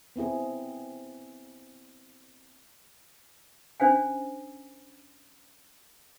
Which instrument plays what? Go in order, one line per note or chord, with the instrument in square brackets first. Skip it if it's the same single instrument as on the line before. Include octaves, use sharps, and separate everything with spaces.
[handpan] B3 C4 E4 G#4
[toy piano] C#4 D4 C5 F5 G#5